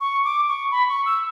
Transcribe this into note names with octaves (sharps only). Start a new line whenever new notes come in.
C#6
D6
C#6
B5
C#6
E6